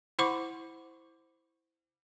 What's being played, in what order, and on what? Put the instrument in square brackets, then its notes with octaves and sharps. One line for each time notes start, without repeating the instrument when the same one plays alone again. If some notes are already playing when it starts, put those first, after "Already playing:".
[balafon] E4 C5 F#5 B5 C#6 D6